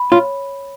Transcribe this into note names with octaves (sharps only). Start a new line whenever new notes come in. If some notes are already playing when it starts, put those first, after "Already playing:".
Already playing: B5
F4 C#5